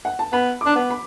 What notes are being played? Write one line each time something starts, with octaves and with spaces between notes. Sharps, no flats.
F#5
A5
B3 B5
D4 D6
B3
B5